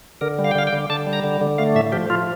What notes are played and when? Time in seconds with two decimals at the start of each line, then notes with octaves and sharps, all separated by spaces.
0.21 D3 A#4
0.39 G3
0.44 F5
0.51 G5
0.55 D3 F5
0.67 G5
0.73 D3
0.90 D3 A5
1.07 G3
1.13 A#5
1.24 D3
1.41 D3
1.58 A3 F5
1.75 A2 E5
1.92 F3 G4
2.10 F3 F4